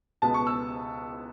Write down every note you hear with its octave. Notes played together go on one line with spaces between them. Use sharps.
C#2 B2 G#3 B3 A5
C#6
E6